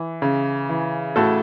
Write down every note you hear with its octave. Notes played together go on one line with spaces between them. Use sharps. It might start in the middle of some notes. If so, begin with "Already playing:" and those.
Already playing: E3
C#3
E3
A2 F#4 A4